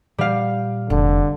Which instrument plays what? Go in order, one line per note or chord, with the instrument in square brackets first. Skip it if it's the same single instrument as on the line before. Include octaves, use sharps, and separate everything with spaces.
[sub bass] A#2 [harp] G3 F5
[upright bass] F1 [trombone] D3